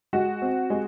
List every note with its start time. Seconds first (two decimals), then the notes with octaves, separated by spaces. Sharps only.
0.13 G#3 F#4
0.42 C4
0.70 G#3